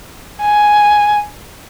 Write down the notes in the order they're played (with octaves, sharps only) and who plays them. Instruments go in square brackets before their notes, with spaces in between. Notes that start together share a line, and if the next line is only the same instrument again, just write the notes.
[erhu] G#5